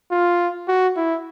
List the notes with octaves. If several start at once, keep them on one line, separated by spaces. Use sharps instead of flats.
F4
F#4
E4